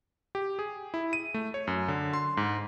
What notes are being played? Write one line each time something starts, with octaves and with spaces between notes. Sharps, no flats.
G4
G#4
E4
D#7
A3
C#5
F#2
D3
C6
G#2